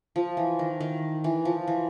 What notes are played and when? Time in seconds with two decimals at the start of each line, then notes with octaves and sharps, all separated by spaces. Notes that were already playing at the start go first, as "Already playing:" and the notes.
0.16 F3
0.37 E3
0.59 D#3
0.81 D#3
1.24 E3
1.45 F3
1.67 E3